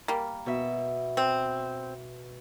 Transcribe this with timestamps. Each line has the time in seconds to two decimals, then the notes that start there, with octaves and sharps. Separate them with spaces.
0.08 G3 A#3
0.46 B2 E5
1.17 C4